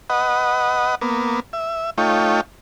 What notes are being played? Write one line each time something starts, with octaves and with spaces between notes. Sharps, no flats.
B4 D#5 F#5
A#3 B3
E5
A3 D#4 F4 C#5 G5